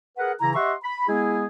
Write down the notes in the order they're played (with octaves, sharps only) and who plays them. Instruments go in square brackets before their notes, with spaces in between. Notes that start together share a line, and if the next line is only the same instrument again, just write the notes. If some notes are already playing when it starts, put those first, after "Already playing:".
[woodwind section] G#4 A#4 B4 F#5
C#3 E3 E4 A#5
G4 D#5 E5 F#5 C6 C#6
B5
G#3 B3 E4 G#4